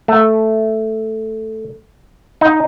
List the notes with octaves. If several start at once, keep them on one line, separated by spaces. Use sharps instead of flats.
A3
D#4